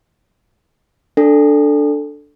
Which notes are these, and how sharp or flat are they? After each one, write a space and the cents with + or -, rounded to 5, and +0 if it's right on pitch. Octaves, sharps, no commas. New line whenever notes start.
D4 +0 A4 +0